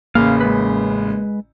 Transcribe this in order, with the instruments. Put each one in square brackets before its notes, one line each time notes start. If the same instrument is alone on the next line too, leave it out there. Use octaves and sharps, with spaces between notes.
[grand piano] A1 C#3 [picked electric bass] A#3 [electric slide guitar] F5
[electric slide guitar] G#3 B4